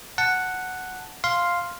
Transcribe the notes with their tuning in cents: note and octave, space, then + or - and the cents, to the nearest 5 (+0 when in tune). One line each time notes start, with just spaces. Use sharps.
F#5 +0 A5 +0
F5 +0 C6 +0